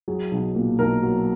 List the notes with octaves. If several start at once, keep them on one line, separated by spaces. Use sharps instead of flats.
F#3 G#4
B1
A#2
B1 A#4
F#3